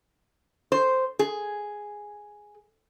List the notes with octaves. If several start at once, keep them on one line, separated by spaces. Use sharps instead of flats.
C5
G#4